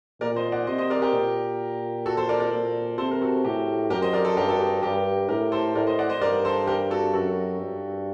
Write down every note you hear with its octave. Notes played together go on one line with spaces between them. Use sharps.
A#2 A#4 D5
C5 D#5
D5 F#5
C3 C5 D#5
C5 D#5
A#4 D5
G4 A#4
A#2
F#4 A4
A4 C5
A#4 D5
A#4 D5
A#2
C3 A4 C5
A#4
F#4 A4
A2 G4
F#2 G4 A#4
C5 D#5
A#4 D5
A4 C5
G2 G4 A#4
F#4 A4
G4
G2 G4 A#4
A2 G4 A#4
A4 C5
A2 A#4 D5
C5 D#5
D5 F#5
C5 D#5
G2 A#4 D5
A4 C5
G4 A#4
F#4 A4
F#2 F#4 A4
G2